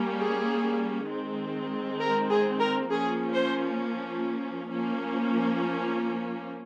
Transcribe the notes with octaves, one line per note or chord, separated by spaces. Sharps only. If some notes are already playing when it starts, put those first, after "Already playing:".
Already playing: G3 A#3 C#4
G#4
D#3 G#3 C4
A#4
G#4
A#4
F3 A#3 C#4 G#4
C5
F3 A#3 C#4